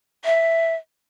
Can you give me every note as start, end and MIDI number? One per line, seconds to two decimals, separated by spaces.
0.25 0.75 76